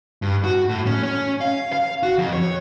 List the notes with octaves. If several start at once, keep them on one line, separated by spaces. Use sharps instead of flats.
G2
F#4
A2
C#4
C#4
F5
F5
F#4
F2
C#5